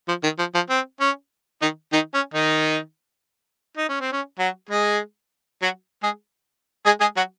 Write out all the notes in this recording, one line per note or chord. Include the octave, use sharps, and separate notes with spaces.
F3
D#3
F3
F3
C4
C#4
D#3 D#4
D#3 D#4
C#4
D#3 D#4
D#4
C#4
C4
C#4
F#3 F#4
G#3 G#4
F#3 F#4
G#3 G#4
G#3 G#4
G#3 G#4
F#3 F#4